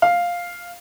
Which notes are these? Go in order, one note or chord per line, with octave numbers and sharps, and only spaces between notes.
F5